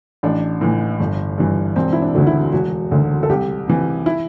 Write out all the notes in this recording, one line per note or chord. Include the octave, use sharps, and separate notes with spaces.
A1 D4
A2 E3
G1
G2 E3
E1 C4
E4
D4
D2 D3 F#4
E4
E1 F#4
D2 D3
A4
C2 G4
C3 E3
E4